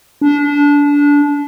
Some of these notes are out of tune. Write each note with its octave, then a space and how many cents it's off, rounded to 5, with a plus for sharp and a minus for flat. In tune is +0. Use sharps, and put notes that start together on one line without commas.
D4 -25